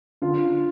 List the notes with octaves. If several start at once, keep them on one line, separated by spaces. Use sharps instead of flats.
D3 F4